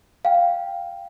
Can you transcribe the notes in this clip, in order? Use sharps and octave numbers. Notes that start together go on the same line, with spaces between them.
F5 G5